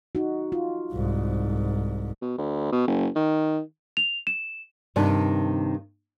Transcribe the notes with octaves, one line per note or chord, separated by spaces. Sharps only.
D#4 F#4
F4
C2 G#2
B2
D2
B2
F#1
D#3
F7
E7
G2 C3 D#3 A5